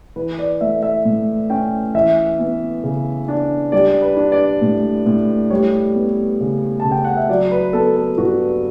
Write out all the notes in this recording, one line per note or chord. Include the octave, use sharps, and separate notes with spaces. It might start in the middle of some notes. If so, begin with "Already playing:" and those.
E3 B4
D5
A3 E5
E5
A2
C#4 G5
E3 E5
B3
C#3
D4
G3 D5
B4
D4
D5
A2
A2
G3 C#5
B3
C#3
C#3 A5
G5
F#5
E5
F#3 D5
B4
B3 A4
A4
G2 F#4